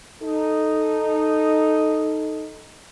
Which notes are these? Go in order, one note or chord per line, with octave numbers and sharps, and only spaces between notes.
D#4 A4